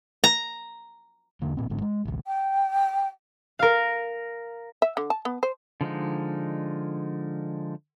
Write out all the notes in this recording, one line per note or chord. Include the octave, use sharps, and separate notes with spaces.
A#5
E2 D3 A#3
G#1 A#2 C4
G#1 G#2 D3
G#3
A1 D2
G5
A#4 F5
E5
D3
A5
B3
C5
D3 F3 G#3 D#4